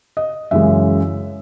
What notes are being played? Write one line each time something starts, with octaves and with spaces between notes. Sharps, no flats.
D#5
F#2 C#3 E3 G#3 E5